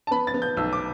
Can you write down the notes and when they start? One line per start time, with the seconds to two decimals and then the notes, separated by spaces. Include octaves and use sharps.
0.07 A5
0.11 B3 B5
0.27 A6
0.34 B3
0.42 G6
0.57 B1 E6
0.73 D6